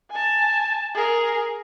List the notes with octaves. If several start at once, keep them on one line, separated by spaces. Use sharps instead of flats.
G#5 A5
G#4 A#4